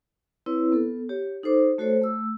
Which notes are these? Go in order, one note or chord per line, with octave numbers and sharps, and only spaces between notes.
C4 E4 B4 C#5
B3 A4
G4 C#5
D#4 A4 C5 D6
A3 F#4 A4 C5 C#5
A3 E6